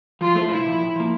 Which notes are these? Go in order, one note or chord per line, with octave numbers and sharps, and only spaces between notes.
F3 F4
A3 E4 A4 C5
C2 E4
A#2 F3
A2
F3 A#3